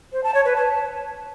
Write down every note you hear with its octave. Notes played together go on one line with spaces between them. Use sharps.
C5
A5
C#5
B4
A5